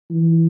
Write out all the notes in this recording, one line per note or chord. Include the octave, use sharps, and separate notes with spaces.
E3